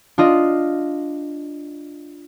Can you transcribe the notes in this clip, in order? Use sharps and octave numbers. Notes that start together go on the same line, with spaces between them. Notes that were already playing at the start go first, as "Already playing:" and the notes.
D4 F4 D#5